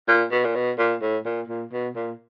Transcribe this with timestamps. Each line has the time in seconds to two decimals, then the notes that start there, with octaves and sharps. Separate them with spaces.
0.08 A#2
0.31 B2
0.45 A#2
0.55 B2
0.78 A#2
1.01 A2
1.25 A#2
1.48 A#2
1.72 B2
1.95 A#2